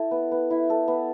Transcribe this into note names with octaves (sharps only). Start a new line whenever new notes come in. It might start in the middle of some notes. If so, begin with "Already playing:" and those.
Already playing: E4 A4
B3
B3
E4
A4
B3